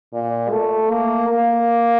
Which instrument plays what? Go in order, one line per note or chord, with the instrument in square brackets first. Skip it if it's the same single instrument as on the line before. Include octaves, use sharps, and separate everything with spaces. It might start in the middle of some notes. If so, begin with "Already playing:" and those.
[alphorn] A#2
A3
A#3
A#3